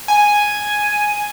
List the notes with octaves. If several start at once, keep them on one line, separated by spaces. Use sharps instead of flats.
G#5